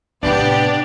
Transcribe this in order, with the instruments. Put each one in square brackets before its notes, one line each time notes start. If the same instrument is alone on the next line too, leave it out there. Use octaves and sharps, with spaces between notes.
[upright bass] A2 C3 [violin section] B3 G4 [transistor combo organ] D4